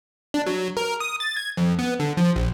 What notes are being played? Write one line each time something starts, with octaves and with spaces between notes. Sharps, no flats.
D4
F#3
A#4
D#6
A6
G#6
F2
B3
D3
F3
A#1